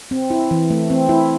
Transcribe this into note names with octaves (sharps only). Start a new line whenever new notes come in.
C4
E4
E3
A3
C4
E4